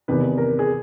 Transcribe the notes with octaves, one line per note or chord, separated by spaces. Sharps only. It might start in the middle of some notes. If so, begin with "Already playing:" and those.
E2 C3 D#3 B4
A#4
G#4